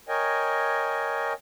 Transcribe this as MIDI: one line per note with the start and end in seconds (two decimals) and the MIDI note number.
0.09 1.33 70
0.09 1.33 73
0.09 1.33 75
0.09 1.33 79
0.09 1.33 80